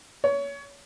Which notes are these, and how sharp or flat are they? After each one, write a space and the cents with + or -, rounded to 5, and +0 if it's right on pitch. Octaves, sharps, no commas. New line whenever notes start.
C#5 +25